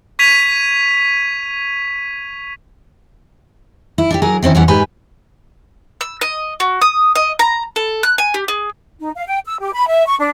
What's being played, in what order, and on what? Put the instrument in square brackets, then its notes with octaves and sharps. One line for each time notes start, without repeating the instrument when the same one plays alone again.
[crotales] C#6 G#6 B6 D#7 F7
[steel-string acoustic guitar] E4
D4 D#4 G4
F#3 G#4 A#4
D#3 C4 C#4 E4
E2 E3 G3 C#4 F#5
G#2 G4 B4 G#5
[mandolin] E6
D#5
F#4
D#6
D#5
A#5
A4
F#6
G#5
G4
G#4
[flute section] D#4
F5
G5
E6
G4
B5
E5
C#6
D4